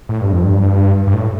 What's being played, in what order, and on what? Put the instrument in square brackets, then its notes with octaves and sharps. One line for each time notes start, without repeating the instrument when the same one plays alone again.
[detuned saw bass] A2
G2
F2
G2
G2
A2